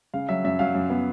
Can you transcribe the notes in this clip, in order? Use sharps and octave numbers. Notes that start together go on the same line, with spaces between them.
C#3 F5
F#3 E5
F#2 E5
F#3 F5
F#2
B3